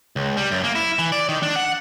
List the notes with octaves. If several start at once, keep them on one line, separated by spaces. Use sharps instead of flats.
C#2
G3
F#2
A#3
E4
E3
D5
D#3
D4
F#5